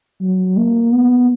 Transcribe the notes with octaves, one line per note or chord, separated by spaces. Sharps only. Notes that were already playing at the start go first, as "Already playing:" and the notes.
F#3
A#3
B3